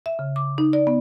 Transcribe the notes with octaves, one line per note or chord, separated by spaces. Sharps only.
E5
C#3
D6
D#4
D5
B3